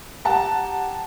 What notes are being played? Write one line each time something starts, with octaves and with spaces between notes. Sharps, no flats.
G4 F#5 A5 A#5